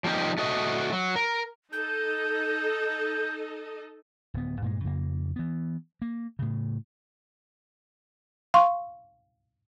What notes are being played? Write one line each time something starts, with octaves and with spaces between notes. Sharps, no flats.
F3 G3 A#3 D#4 G4
A3 F#4 D#5
F#3
A#4
D#4 A4 D#5 G6
D1 B3
G2 A#2 G#3
F2 C#3 A#3
E3 B3
A#3
A2 C#3
F5 C6 C#6